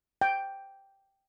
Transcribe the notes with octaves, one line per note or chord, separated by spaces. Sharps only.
G5